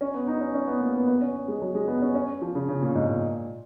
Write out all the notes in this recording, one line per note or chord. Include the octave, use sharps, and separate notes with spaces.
C#4
B3
D#4
C#4
C#4
B3
A#3
B3
B3
C#4
G#3
F#3
G#3
B3
C#4
C#4
F3
C#3
C#3
A#2
G#2
A#2